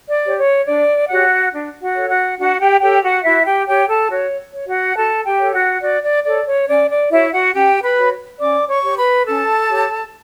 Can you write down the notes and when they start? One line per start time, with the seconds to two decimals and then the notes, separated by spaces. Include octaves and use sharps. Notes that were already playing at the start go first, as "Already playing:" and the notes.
0.09 D5
0.24 G4 C#5
0.38 C#5
0.66 D4 D5
1.09 F#4 G4 C#5 F#5
1.53 D4
1.82 F#4 F#5
1.96 A4 C#5
2.09 F#4 F#5
2.38 D4 F#4 F#5
2.59 G4 G5
2.81 G4 A4 C#5 G5
3.03 F#4 F#5
3.24 E4 F#4 E5
3.45 G4 G5
3.67 G4 C#5 G5
3.88 A4 A5
4.10 F#4 C#5
4.53 C#5
4.68 F#4 F#5
4.96 F#4 A4 A5
5.25 G4 G5
5.39 A4 C#5
5.53 F#4 F#5
5.82 F#4 D5
6.04 D5
6.25 A4 C#5 D5
6.47 C#5
6.68 C#4 D5
6.90 D5
7.11 E4 F#4 C#5 E5
7.33 F#4 F#5
7.54 C#4 G4 G5
7.82 B4 B5
7.97 F#4 C#5
8.40 C#4 D5 D6
8.69 C#5 C#6
8.83 G4 C#5
8.97 B4 B5
9.25 C#4 A4 A5
9.70 G4 C#5